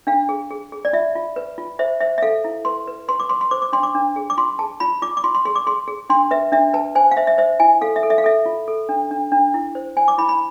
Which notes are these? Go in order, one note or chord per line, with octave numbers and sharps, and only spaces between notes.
D4 F5
G#4
G#4
G#4
D5
F4 E5
F4
B4
F4
C5 E5
C5 E5
E5
A4 F5
E4
B4 C6
B4
B4 C6
D6
B4 C6
C6
C5 D6
D6
D4 C6
D6
D4
G#4
D6
F4 C6
G#4 A5
F4 B5
F4 D6
D6
F4 C6
C6
G#4 C6
D6
G#4 C6
G#4
D4 C6
B4 E5
D4 E5
B4 A5
C5 G#5
F5
C5 E5
E5
C5 E5
E4 G#5
A4 F5
E5
A4
E5
F5
A4 E5
F4
A4
D4
D4
D4
E4
C5
C5 G#5
D6
E4 B5
B5